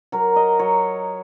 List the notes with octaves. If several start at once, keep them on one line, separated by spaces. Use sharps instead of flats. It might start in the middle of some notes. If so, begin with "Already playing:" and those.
F#3 A#4
D#5
F#3 C#5